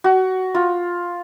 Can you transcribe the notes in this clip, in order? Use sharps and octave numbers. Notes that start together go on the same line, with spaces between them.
F#4
F4